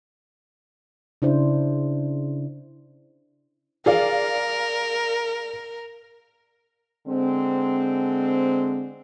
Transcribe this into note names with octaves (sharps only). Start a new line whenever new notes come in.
C#3 D4 E4 C5
G#4 A#4 D5 F5
D3 G#3 C4